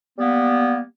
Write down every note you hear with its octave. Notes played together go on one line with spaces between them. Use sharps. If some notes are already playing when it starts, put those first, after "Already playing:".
G3 A#3 B3